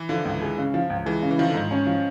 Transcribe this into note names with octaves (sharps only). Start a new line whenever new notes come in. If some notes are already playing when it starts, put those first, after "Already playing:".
Already playing: E3
D3 F3
C#2
G#3
C#3
F3
C#2
E3 G#3
C#3
E3
D#3 F3
D3
G#2 D#3
C#4
F3